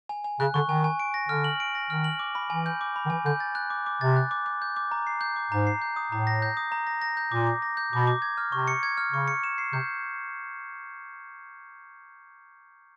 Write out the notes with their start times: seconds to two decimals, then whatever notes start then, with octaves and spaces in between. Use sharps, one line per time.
0.09 G#5
0.24 G#5
0.40 C#3 F#6
0.54 D3 C#6
0.69 D#3 G#5
0.84 G#5
0.99 D7
1.14 A#6
1.29 D3 F6
1.44 F#7
1.60 D7
1.75 A#6
1.90 D#3 F6
2.04 F#7
2.19 D6
2.35 B5
2.50 E3 G#5
2.66 G6
2.81 D6
2.96 B5
3.05 D#3
3.10 E3 G#5
3.25 D3 G6
3.40 A6
3.55 F#6
3.70 D6
3.86 D6
4.01 C3 A6
4.16 F#6
4.31 D6
4.46 D6
4.62 G6
4.76 D6
4.91 A#5
5.07 C7
5.21 G6
5.36 D6
5.52 G#2 A#5
5.67 C7
5.82 G6
5.96 D#6
6.12 A2 A#5
6.27 A#6
6.42 G6
6.57 D#6
6.72 A#5
6.87 A#6
7.02 A#6
7.17 G6
7.32 A#2 D6
7.47 D6
7.62 A#6
7.77 G6
7.93 B2 D6
8.07 D6
8.22 G#6
8.38 F6
8.52 C3 C#6
8.68 C#7
8.83 G#6
8.97 F6
9.12 C#3 C#6
9.28 C#7
9.44 E7
9.58 C7
9.73 C3 G6